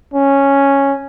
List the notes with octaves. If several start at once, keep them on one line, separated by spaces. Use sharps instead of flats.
C#4